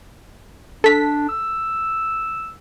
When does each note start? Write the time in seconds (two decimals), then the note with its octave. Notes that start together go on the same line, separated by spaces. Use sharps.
0.84 D4 A4 B6
1.29 E6